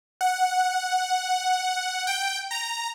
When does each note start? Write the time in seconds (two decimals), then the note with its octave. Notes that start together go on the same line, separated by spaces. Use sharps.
0.21 F#5
2.07 G5
2.51 A#5